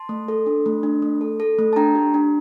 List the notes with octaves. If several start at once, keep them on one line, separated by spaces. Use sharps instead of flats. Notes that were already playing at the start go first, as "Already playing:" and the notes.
Already playing: A5 C6
A3
A4
D4
A3
D4
A3
A4
A4
A3
A5
D4 G5 A#5
G4
D4